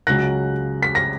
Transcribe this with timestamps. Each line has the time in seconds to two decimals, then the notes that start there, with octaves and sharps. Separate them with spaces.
0.07 C#2 C#3 F#3 F#6 A#6
0.83 B6
0.95 A#6